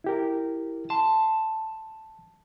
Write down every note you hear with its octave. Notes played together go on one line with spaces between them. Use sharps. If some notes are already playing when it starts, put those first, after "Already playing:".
E4 G4 A#4
A5 C6